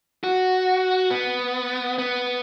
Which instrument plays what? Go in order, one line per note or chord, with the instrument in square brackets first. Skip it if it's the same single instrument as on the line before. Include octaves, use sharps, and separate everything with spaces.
[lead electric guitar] F#4
B3
B3